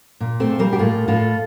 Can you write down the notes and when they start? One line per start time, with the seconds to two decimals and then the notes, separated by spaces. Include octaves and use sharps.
0.20 A#2
0.40 A3 C4
0.50 A#2
0.59 G3 A#3
0.73 G4
0.79 A2 F4 A4
1.08 A2 F4 A4